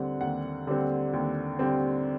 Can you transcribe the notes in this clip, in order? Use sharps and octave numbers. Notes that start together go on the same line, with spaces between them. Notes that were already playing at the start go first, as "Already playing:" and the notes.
Already playing: D#2 D3 G3 C4 F#5
D#2 F#5
D3 G3 C4
D#2
D3 G3 C4